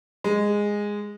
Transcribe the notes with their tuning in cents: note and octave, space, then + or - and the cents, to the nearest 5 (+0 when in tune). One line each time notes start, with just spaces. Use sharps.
G#3 -10